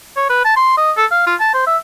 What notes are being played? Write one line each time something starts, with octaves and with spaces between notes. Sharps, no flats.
C#5
B4
A5
C6
D#5
A4
F5
F4
A5
C5
E5